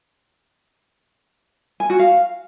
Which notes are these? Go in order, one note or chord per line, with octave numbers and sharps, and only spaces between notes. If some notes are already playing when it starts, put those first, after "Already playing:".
G#5
F#4
F5